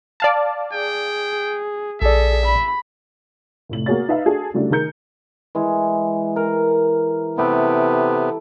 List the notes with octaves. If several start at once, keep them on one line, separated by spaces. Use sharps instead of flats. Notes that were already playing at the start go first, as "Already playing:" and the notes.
D5 F5 A5
G#4 G5
A#1 G#4 A4 D5 E5
B5
F1 A2 F#7
A#3 F#4 G#4 C#5 A6
D#4 B4 E5 F5
D4 F#4 G#4 A4
C#3 F#3 G3 A3 D4 E4
D#3 G#4 A#4 G6 C#7
E3 G#3
A#4
C3 B3 E4 G4 A4